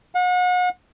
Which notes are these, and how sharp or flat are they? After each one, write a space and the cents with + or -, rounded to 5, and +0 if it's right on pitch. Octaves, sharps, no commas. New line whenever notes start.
F#5 -40